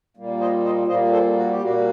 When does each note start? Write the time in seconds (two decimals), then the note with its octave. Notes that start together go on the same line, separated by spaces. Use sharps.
0.17 A#2 G3 A#3
0.40 C5 D#5
0.64 C5 D#5
0.88 A#2 G3 A#3 C5 D#5
1.11 A4 C5
1.35 F#4
1.49 G4
1.59 A#2 G3 A#3 F#4